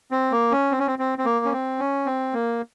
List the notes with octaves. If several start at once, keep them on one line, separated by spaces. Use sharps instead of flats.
C4
A#3
C#4
C4
C#4
C4
C4
C4
A#3
C#4
C4
C#4
C4
A#3